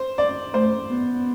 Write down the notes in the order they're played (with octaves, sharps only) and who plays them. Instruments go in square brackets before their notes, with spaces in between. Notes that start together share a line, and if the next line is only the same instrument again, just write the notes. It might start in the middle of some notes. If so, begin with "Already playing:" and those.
Already playing: [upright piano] C5
D5
[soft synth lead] A3 [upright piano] C5
[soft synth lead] B3